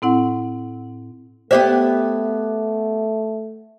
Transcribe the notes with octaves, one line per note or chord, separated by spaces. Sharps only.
A2 C4 E4 F#5
A3 B3 G4 C5 D5 E5